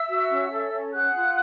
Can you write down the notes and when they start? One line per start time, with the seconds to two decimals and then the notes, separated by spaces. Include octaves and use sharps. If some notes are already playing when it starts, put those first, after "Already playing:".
Already playing: E5 E6
0.09 F#4
0.30 C#4
0.51 A4
0.72 C#4
0.93 G#4 F#5 F#6
1.15 F4